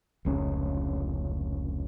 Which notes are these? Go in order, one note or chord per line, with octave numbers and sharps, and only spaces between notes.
F1 C#2 C#4